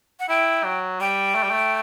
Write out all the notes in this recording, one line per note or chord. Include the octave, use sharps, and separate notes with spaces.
F#5
E4 G5
F#3
G3 G5
A3
G3
A3